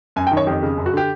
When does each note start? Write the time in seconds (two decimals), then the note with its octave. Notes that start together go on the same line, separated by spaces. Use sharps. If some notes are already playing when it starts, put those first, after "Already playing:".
0.16 F#2 G#5
0.27 G5
0.32 D#3
0.37 C#5
0.47 F2 G4
0.63 C#3
0.78 F#2
0.86 F#4
0.93 D3 G4